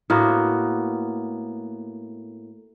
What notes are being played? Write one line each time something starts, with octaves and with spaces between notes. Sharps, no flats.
A2 A#3 B3 F#4